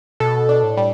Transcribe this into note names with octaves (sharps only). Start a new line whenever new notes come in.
B2 A4
D4
A2
G3